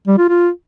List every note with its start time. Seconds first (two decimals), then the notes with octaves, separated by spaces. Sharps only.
0.07 G3
0.18 F4
0.28 F4